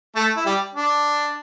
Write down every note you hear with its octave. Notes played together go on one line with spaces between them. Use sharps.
A3 A4
E4
G3 G4
D4